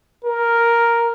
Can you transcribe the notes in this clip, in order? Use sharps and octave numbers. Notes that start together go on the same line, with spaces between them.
A#4